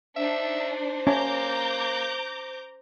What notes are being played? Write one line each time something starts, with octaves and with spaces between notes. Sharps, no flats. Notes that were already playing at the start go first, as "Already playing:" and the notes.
D4 D#4 C5 E5
A#3 C#4 A#5 D6 G6